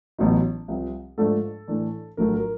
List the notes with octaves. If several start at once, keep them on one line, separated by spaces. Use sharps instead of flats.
A1 A2 F#3 B3 D#4
C2 C3 F3
G#2 F3 A3 D4 A4
A2 E3 A3 D4
A#1 A2 F#3 A3 A#4
A#4